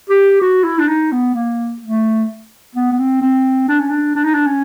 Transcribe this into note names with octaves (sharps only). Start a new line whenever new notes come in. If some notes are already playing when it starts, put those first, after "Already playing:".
G4
F#4
E4
D4
D#4
B3
A#3
A3
B3
B3
C4
C4
D4
C#4
D4
D4
D#4
D4
C#4